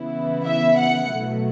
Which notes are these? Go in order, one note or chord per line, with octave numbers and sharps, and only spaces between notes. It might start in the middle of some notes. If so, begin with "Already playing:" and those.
Already playing: C#3 E3 B3 E4
E5
F#5
B2 F#3 A3